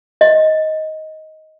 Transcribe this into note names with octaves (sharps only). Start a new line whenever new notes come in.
D#5